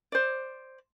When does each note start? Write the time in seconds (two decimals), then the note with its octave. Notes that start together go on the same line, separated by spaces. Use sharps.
0.12 C5 D5